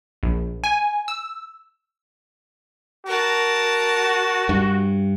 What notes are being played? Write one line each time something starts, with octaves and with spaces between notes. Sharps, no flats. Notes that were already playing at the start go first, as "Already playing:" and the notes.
A#1
G#5
E6
F#4 A#4 A5
G2